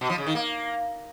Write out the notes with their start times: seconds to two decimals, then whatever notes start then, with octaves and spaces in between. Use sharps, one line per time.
0.01 B2
0.10 F3
0.18 C#3
0.27 D#3
0.35 A#3